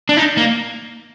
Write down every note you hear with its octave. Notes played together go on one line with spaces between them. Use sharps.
D4
D#4
A#3